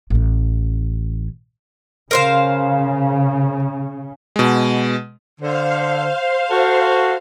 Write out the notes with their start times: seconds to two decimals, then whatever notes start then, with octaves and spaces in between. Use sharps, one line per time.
0.10 A1 C#4
2.11 C#3 A#4 C5 F5
4.36 B2 G#3
5.40 D3 C5 F5
6.50 F#4 A4